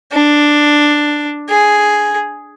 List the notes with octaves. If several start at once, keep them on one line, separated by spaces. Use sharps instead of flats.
D4
G#4